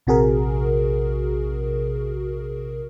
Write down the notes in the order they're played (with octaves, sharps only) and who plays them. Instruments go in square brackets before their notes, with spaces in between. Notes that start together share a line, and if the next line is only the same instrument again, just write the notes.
[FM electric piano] A#1 C3 F#4 G#4 A#4